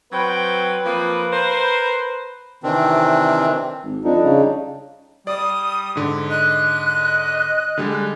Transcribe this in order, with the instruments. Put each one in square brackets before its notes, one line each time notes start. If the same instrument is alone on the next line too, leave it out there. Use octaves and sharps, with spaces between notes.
[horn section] F#3 C4 G5 [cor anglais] B4
[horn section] F3 A#3 C4
A#4 C5
[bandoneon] C3 D#3 E3 C4 D4
[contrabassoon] G#1
[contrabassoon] F2 [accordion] G3 D4 D#4
[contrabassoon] C#3
[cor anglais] G3 [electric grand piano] D5 [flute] D#6
[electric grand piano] G#2 D3
[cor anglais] D#5 [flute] F#6
[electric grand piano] D3 G3 G#3